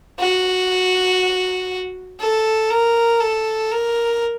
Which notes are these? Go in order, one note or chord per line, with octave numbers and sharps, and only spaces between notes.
F#4
A4
A#4
A4
A#4